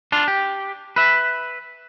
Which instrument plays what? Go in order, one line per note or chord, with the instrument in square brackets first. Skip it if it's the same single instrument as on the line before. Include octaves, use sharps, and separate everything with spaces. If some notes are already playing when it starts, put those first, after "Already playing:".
[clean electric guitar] D4 F4
G4
B4 E5